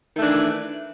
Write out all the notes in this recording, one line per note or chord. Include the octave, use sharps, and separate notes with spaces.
D#3 E3 A3 D4